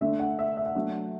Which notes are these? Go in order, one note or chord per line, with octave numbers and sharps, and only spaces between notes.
D3 A3 D4 E5
F#5
E5
E5
F#5
F#3 A3 D4